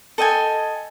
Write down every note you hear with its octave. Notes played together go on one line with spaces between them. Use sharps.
A4 D#5 G5 G#5